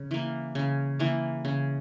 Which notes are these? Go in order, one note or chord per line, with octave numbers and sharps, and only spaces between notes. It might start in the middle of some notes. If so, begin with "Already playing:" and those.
Already playing: C#3
E3 A#3
C#3
E3 A#3
C#3